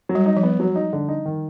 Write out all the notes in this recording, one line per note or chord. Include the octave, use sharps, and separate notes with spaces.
F#3
G3
D#4
F3
B3
F#3
D#4
D3
D#4
D#3